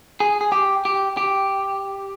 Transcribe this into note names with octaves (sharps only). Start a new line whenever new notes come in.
G#4
G#4
G4
G4
G4